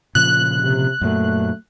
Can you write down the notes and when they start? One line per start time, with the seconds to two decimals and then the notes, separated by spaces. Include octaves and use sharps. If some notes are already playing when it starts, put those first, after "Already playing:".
0.15 A#2 C#3 F3 F#6
0.56 C3
1.01 F#2 A#2 F#3 A3